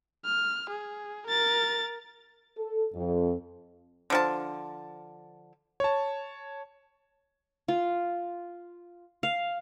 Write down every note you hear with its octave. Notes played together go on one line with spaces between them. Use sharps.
F6
G#4
A#4 A6
A4
F2
D3 F3 A5
C#5 A5
F4
F5